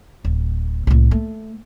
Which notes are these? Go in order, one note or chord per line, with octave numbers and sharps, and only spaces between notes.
D1
C2 A2
A3